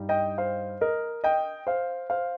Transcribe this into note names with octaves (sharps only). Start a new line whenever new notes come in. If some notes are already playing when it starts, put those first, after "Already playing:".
Already playing: G2 G3 D#4
D#5 G5
C5 F5
A#4 D#5
D#5 G5
C5 F5
C5 F5